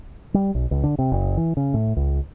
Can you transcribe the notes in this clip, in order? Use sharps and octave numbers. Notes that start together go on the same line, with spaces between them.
G3
B1
C#2
D3
C3
F#1
E3
C#3
A2
C#2